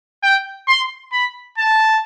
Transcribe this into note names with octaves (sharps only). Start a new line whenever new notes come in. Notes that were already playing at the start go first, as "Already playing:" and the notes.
G5
C6
B5
A5